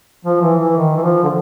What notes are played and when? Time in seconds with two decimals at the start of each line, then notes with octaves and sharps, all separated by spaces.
0.25 F3
0.41 E3
0.60 E3
0.76 D#3
0.97 E3
1.02 F3
1.23 D3